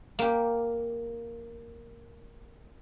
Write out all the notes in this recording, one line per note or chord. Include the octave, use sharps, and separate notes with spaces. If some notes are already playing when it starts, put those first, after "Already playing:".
A#3 G4